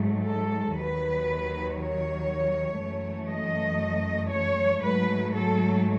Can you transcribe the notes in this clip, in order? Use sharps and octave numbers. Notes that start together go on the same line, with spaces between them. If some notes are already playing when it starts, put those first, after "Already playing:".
Already playing: G#2 F#3 A3
A4
D#2 D#3 F#3 B4
C#5
F#2 E3 A3
D#5
C#5
G#2 F#3 A3 B4
A4